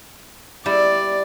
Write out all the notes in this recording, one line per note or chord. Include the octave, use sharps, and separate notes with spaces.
G3 E4 D5